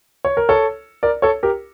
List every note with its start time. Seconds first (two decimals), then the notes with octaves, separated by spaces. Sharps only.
0.25 C#5
0.37 A#4
0.49 A4 C#5
1.03 A#4 D5
1.22 A4 C#5
1.43 G4 A#4